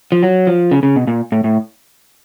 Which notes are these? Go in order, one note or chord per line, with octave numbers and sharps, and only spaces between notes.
F3
F#3
F3
C#3
C#3
B2
A#2
A2
A2